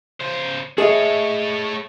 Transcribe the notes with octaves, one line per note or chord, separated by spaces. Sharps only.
C#3 C5
A3 G#4 C#5 D#5 E5